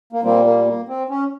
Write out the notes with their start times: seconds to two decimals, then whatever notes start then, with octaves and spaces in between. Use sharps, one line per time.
0.13 A#3
0.23 A#2 G3 A#3 C4
0.45 A#3
0.66 A#3
0.88 C4
1.09 C#4